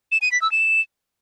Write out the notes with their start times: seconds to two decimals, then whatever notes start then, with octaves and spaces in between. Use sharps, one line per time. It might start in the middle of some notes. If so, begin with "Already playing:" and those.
0.12 E7
0.22 D#7
0.32 B6
0.42 E6
0.52 E7